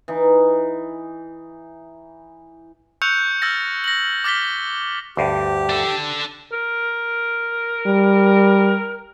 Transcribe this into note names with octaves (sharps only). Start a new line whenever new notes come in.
E3 D#4
C#6 E6 F#6 G6 C#7 F7
E6 F6 A6 A#6
A#6 F#7
D6 F6 A6 B6 G7
D2 G2 G4
D4 A4
A#4
G3